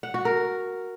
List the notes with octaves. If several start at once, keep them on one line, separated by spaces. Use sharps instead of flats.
F#5
F#4
A#4